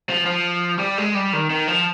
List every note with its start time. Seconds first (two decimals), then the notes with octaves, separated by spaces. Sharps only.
0.10 F3
0.26 F3
0.79 G3
0.98 G#3
1.15 G3
1.33 D#3
1.50 D#3
1.68 F3